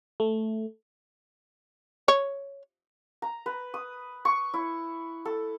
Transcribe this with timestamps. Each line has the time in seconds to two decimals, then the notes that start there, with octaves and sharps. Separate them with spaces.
0.20 A3
2.08 C#5
3.22 A#5
3.46 B4
3.74 D#6
4.25 C#6
4.54 E4
5.25 A4